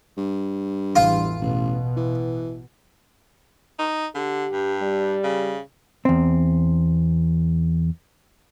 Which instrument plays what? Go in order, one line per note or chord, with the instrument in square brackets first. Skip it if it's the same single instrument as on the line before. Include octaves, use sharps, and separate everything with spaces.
[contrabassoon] G2
[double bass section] A1 E2 E3 [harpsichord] F4
[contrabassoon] A1 [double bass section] B2
[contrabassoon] E3
[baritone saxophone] D#4
[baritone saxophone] D3 [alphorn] G4
[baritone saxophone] G2
[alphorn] G3
[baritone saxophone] C#3
[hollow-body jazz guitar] E2 C4